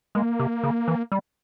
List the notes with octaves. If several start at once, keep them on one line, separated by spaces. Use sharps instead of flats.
G#3 A#3
C3
C#3
E3
G3